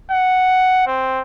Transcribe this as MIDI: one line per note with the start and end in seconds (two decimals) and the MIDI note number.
0.11 0.84 78
0.87 1.22 60